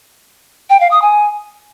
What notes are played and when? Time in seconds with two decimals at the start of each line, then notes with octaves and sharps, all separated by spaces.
0.70 G5
0.80 F5
0.91 D#6
1.02 G#5